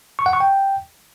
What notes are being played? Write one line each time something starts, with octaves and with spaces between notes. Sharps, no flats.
C#6
F#5
C#6
G5